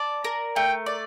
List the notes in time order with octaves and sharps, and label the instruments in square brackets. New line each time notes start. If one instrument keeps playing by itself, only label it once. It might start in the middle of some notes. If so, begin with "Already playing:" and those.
Already playing: [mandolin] D5 A5
A#4
[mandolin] A3 [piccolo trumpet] G5
[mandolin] D5